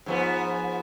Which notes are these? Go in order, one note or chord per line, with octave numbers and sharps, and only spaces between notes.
G#2 F3 B3